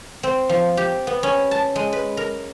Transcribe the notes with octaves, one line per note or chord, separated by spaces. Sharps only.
C4
F3
G4
B3
C#4
A5
G#3
B4
A#4